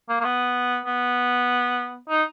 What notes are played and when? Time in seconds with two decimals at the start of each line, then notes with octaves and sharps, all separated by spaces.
0.09 A#3
0.20 A#3
0.24 B3
0.86 B3
2.09 D#4